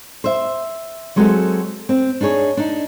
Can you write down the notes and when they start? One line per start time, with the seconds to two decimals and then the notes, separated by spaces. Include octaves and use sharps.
0.24 C5 E5
1.16 F#3 G#3 C4 F#4 G4 A4
1.89 C4
2.21 D4 D#4 G#4 C#5
2.57 D4 D#4